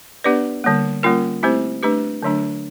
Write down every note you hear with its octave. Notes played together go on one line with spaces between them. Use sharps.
B3 D4 G4 B4 D5
D3 G3 A#3
G3 A#3 C#4 F4 A#4
A3 C4 E4 G4 C5
A3 D4 G4 B4
D3 F#3 A3 D4